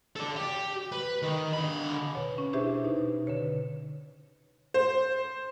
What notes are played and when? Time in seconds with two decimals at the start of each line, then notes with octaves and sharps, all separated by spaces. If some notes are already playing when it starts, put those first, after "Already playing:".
0.16 A4 D5
0.36 G4
0.92 B4
1.22 D#3
1.53 D3 B5
2.15 B2 C#5
2.38 C#4
2.53 D4 E4 G4 G#4 C5 E5
2.84 B2 D#4
3.27 D3 B4 C#5
4.74 C5